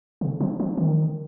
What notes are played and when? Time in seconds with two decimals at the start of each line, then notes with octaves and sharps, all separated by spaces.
0.21 C#3
0.41 F3
0.60 F3
0.77 D#3